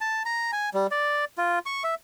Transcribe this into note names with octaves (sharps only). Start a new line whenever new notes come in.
A5
A#5
G#5
G3
D5
F4
C#6
E5